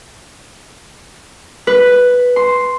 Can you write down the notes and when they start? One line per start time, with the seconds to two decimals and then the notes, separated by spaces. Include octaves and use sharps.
1.67 B4
2.36 C6